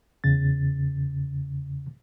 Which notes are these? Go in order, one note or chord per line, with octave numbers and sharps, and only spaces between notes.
E2 C#3 A6